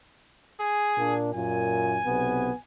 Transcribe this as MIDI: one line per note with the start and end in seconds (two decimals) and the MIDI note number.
0.60 1.15 68
0.98 1.31 46
0.98 1.31 58
0.98 1.31 62
1.34 1.99 42
1.34 1.99 46
1.34 2.59 80
2.05 2.51 35
2.05 2.51 48
2.05 2.51 59